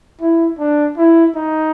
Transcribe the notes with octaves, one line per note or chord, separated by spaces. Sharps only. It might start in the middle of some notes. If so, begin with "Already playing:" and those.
E4
D4
E4
D#4